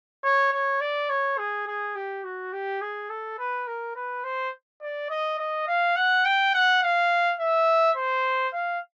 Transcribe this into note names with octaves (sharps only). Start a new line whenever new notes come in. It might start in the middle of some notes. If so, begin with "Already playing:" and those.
C#5
C#5
D5
C#5
G#4
G#4
G4
F#4
G4
G#4
A4
B4
A#4
B4
C5
D5
D#5
D#5
F5
F#5
G5
F#5
F5
E5
C5
F5